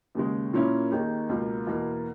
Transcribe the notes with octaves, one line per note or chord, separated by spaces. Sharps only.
D#2 C#3 G#3
A#2 A#3 C#4 E4
D#2 D#3 A#3 D#4 G#4
C#2 B2 A#3
E2 B2 A#3